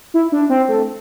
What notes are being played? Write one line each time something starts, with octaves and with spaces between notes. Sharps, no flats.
E4
D4
C4
A3